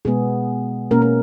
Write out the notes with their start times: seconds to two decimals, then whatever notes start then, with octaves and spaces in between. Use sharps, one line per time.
0.05 B2 G#3 B3 G#4
0.91 B2 A#3 C#4 A#4
1.02 A#4